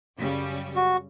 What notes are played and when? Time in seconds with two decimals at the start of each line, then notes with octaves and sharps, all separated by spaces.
0.18 F#2 C#3 G3
0.76 F#4